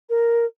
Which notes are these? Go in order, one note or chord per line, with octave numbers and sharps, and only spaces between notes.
A#4